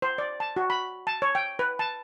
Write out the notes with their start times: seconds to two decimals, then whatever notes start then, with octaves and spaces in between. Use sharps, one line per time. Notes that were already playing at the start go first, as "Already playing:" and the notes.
0.02 C5
0.18 D5
0.40 A5
0.56 F#4
0.70 B5
1.07 A5
1.22 C#5
1.35 G5
1.59 B4
1.79 A5